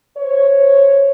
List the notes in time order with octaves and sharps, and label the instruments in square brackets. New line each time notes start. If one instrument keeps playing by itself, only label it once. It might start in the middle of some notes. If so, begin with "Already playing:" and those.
[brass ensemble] C5 C#5